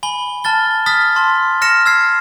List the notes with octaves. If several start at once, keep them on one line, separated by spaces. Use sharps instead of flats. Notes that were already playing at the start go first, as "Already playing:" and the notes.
G#5 B5 G7
A5 F6 A6 G7
D#6 F6 A6 B6
A5 C6
F6 A#6 C#7 E7
E6 F6 G#6 B6 C7